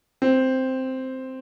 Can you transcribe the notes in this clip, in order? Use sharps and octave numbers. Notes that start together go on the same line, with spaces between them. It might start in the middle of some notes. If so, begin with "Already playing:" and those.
C4